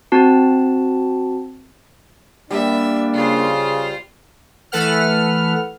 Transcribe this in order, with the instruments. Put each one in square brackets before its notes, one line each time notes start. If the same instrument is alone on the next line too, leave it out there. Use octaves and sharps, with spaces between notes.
[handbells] C4 F#4 A5
[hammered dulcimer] G3 [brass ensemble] A#3 D4 [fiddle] E5
[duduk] C#3 [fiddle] F4 C5
[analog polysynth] E3 A3 A4 B4 F#5 F6